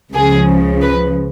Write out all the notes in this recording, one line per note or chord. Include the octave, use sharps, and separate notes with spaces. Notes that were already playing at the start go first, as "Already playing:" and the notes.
C#2 C#3 F3 G#4
B4